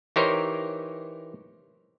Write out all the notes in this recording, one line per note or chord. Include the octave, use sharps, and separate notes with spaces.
E3 D#4 G4 A#4 C5 C#5